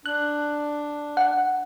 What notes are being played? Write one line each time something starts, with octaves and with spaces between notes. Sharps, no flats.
D4 F#6
F#5